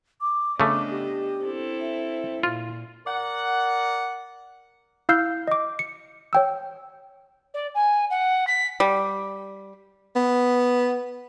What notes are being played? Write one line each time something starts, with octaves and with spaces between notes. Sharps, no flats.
D6
C#3 A3 B3 D4 D#5 D6
G4
C4 E4 A4
E5
A#2 F4
A#4 D5 F#5
E4 F5 E6 F6 G6 C7
D#5 D6
C#7
C#5 G5 E6
D5
G#5
F#5
B6
G3
B3